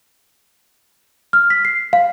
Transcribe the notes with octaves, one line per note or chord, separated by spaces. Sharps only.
F6
B6
C7
F5